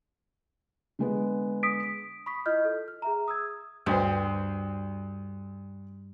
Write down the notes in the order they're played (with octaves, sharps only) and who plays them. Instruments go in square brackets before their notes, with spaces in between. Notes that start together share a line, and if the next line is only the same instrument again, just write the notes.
[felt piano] D3 G#3 B3
[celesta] D#6 B6 D7
B5 C#6 D#6 B6
E4 F4 D#5 F6 G6
A4
F6
G#4 E5 A#5
D#6 E6 G#6
[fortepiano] D2 C5 [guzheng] G2